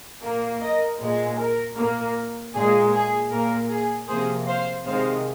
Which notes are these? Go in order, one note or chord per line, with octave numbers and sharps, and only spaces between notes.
A#2 A#3
A#4 D#5
A#2 G#3
A#4
A#3
A#2
A#2 G#3 G#4
G#4
A#2 A#3 A#4
G#4
C3 F3 A#3 G#4 C5
C5 F5
C3 D#3 G#3 C5 F5